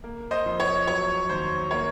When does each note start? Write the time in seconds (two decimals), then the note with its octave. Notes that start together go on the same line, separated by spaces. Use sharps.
0.04 A#3
0.31 C5 D#5
0.46 F2
0.60 C#5
0.87 F#3 C#5
1.29 D#2 C5
1.71 A#3 C#5